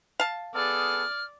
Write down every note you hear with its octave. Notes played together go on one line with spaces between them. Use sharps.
F5 A5
B3 G#4 A4 D5 F6